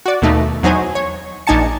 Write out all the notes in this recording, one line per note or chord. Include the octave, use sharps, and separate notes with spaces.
F#4 D5
D#2 B2 A3 D#4
E2 F#3 D#4 C5 G#5
C#5
A#1 D4 D#4 G#5 A5 C#7